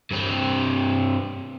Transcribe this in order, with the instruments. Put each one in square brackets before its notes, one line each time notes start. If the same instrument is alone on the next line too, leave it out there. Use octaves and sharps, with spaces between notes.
[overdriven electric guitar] G2 C4